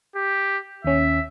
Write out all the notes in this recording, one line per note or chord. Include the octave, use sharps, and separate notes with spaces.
G4
D#2 C#4 E5